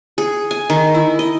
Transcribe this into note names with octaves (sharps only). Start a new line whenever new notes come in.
G#4
G#5
D#3
E4
D#5